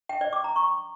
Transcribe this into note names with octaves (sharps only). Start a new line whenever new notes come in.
G5
D5
D6
A#5
C#6